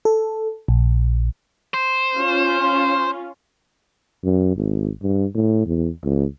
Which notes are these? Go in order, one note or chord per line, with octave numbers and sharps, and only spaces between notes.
A4
A#1
C5
C#4 F4
F#2
G#1
G2
A2
E2
C#2